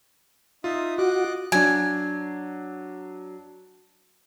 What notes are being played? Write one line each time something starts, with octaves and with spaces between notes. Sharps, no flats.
D#4 F4 E5 D#6
F#4 D#5 D6 F#6
F#3 D4 G#5